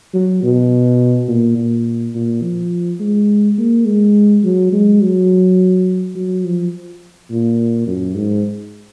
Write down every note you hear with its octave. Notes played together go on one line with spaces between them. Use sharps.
F#3
B2
A#2
A#2
A#2
F3
G#3
A#3
G#3
F#3
G#3
F#3
F#3
F3
A#2
F#2
G#2